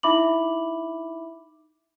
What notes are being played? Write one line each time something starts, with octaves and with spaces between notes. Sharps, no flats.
D#4 E4 E5 B5 D6 F#7